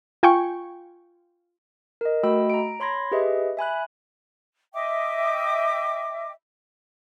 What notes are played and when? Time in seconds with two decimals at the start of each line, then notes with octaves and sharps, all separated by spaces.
0.23 F4 G5 G#5 C#6
2.01 A#4 D#5
2.23 A3 F#4 D#5 G5 B5 E6
2.50 A#5 D7
2.80 C#5 B5 C6 G#6 A#6
3.12 G4 G#4 B4 D#5 E5
3.57 E5 G#5 B5 F#6
4.73 D#5 E5 G5 D6